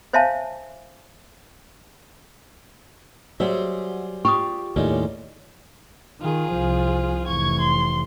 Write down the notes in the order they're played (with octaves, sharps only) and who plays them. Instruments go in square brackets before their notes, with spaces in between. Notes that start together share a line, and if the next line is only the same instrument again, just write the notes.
[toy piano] C5 C#5 E5 F5 G#5 A5
[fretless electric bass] F#3 [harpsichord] G3 G#4 C5 [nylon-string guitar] F#4 E5
[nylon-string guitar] F4 G4 F5 [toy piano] C#6 D#6
[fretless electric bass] D#2 A2 [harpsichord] C#3 G3 G#3
[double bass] D#3 [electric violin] F4 G#4
[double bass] C2 F3
[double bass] F1 E3 [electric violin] C#6 G#6
[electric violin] C6